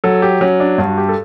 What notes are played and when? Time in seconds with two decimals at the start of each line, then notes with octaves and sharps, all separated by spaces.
0.04 F#3 A4
0.22 G4
0.41 F#3 C#4
0.60 D4
0.78 G2 F#4
0.98 G4
1.09 A4